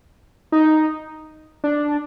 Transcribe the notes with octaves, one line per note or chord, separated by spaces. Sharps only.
D#4
D4